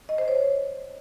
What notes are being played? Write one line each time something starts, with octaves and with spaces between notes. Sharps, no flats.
D#5
C5
C#5